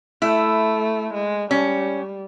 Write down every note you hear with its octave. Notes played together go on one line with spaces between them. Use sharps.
A3 E4
G#3
G3 C#4